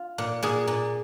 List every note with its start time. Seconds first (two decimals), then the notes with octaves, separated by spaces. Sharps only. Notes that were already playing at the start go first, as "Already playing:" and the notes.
Already playing: F4
0.18 A#2
0.43 A#2 G#4
0.67 A#2